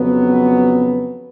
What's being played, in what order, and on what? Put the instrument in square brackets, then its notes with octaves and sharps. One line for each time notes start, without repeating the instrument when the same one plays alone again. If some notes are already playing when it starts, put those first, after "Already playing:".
Already playing: [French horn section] F2 C#3 F#3 B3